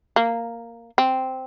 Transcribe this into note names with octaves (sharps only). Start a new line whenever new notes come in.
A#3
C4